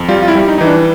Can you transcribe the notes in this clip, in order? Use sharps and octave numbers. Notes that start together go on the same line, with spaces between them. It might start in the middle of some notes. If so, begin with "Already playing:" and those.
Already playing: F2
G3 F4
F4
E4
G3
D#4
E3 D#4
D4